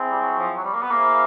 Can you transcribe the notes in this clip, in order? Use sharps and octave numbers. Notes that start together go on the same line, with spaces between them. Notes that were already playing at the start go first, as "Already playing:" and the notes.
Already playing: C4 E4 G#4
G3
F#3
F3
F#3
G3
A#3
B3
A#3 E4 G#4 C5 F5